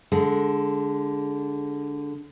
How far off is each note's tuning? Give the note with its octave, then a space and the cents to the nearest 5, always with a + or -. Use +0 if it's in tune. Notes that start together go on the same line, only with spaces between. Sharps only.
D3 -10 G#3 +0